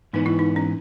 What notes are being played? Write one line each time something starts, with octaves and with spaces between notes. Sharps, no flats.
G#2 E3 B3 D#4
E4
D#4
C#4